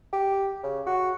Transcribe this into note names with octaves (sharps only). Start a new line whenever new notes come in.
G4
C#3
F#4